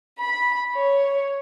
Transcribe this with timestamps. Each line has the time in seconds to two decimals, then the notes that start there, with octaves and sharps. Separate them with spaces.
0.19 B5
0.75 C#5